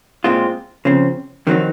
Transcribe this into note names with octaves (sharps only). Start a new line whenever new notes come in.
A#2 G#3 C4 F4
C#3 F3 C4
F2 D#3 F#3 C4 D#4